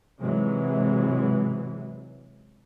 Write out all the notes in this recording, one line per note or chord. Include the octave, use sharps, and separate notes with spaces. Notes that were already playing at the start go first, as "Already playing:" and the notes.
G#2 C3 E3 F#3 G#3